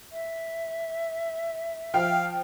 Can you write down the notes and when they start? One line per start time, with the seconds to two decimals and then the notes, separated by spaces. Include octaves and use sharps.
0.12 E5
1.94 F3 F5 G5 F6